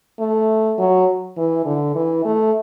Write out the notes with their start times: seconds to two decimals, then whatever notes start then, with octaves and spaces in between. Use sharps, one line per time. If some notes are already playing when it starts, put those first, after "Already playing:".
0.19 A3
0.78 F#3
1.37 E3
1.65 D3
1.95 E3
2.25 A3